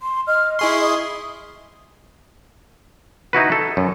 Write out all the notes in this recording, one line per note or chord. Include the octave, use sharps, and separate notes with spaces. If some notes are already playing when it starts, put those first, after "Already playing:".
C6
D#5 F6
E4 G#4 C6 C#6
D#6
D#4 E4 F#4 B4
A4
F#2